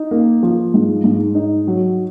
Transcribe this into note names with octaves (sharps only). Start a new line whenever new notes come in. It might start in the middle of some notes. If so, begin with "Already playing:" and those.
Already playing: D#4
A#3
F3
G#2
G#2
D#4
F#3